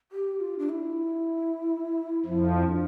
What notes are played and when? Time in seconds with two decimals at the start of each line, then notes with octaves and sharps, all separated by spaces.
0.12 G4
0.40 F4
0.59 D4
0.69 E4
2.25 F2 F3
2.69 D4